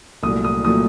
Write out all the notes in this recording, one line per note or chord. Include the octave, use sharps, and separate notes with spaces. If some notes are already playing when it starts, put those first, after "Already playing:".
C2 A#2 F#3 A3 D#6
D#6
A#2 F#3 A3 D#6